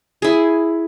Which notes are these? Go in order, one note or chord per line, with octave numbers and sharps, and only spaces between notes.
E4 G#4